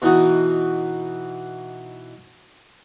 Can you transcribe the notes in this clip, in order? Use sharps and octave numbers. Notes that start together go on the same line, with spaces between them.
B2 E3 D#4 F#4